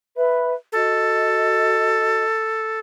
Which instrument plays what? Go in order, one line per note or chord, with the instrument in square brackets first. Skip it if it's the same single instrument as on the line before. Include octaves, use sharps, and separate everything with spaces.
[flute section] B4 E5 B5
[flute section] F#4 D#5 [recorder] A4